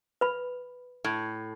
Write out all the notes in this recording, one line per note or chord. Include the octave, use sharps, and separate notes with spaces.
B4 B5
A2